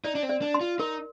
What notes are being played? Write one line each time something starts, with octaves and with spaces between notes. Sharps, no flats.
D#4 D5
D4
C4
D5
D4
C6
F4
D#4 A#4